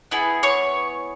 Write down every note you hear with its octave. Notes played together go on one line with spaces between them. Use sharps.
B3 E4 G#4
C#5 C#6